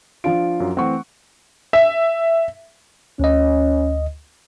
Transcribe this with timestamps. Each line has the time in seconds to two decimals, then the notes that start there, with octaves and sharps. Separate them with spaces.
0.24 F3 D4 F4 D7
0.60 F#2 F#3
0.77 E3 A3 C4 F#5 C#6
1.73 E5
3.20 D2 C#4 D#5